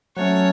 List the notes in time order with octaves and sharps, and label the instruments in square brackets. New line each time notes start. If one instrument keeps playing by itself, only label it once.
[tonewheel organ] F#3 A3 C#4 [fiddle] C#5